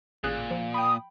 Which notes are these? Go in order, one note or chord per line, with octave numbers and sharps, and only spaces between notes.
A1 A#2 G#4 F#6
F3
G5 B5 D#6